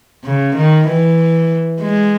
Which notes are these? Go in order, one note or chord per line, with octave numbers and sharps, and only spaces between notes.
C#3
D#3
E3
G#3